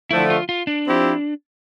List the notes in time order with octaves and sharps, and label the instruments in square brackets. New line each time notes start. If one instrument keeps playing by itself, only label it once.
[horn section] D3 F3 A3 [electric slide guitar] E4
[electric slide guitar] F4
F4
D4
[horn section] F3 C4 E4 G4